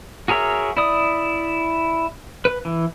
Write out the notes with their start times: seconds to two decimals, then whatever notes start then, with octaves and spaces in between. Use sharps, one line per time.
0.28 F#4 G#4 A#4 C#5 E5
0.77 E4 D5 D#6
2.45 B4
2.65 E3